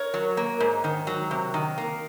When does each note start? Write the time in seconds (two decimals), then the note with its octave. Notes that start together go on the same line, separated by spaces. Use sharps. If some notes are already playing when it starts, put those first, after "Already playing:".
Already playing: A#4 C#5
0.14 F#3
0.37 A#3
0.60 G#2
0.84 D#3
1.07 F#3
1.31 C3
1.54 D#3
1.78 A#3